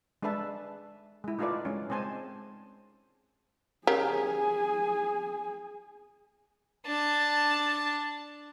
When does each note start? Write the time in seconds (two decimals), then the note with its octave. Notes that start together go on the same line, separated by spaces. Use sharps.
0.22 G#3 D4 A4 B4 E5 A5
1.24 G#3 E4
1.39 A3 D#4 F4 A4 B4 D5
1.65 G#3 C#4
1.90 G#3 C4 C5 G#5 A5
3.87 C#3 G4 G#4 A#4 G#5
6.86 D4 A5